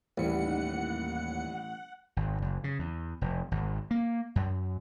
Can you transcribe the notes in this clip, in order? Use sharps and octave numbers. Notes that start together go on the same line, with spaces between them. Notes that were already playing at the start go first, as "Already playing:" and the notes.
A1 D#2 E3 G3 F#5 C#7
G#1
F#1
C#3
E2
F1
G#1
A#3
F#2